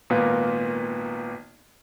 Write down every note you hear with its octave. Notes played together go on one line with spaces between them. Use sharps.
G#1 A#2 A#3 B3 B4